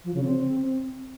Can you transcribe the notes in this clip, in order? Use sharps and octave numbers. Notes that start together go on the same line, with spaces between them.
F3
C#3
C4